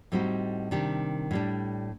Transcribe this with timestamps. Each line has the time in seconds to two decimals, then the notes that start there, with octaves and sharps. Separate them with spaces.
0.12 A2 G3 C4 D#4 F#4
0.71 C3 D#3 G3 D4 G4
1.31 A2 G3 D4